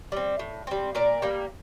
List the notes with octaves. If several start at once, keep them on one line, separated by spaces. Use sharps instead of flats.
G3 C4
A2
G3 C4
A#2 A#4 D5
G3 A#3